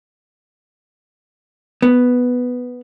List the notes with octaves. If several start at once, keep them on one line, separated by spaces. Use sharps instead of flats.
B3